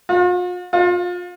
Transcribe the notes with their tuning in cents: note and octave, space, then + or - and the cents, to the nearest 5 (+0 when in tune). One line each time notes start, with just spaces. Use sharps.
F4 +45
F4 +30